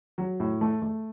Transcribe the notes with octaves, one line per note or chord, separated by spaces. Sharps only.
F#3
A2
A3
A3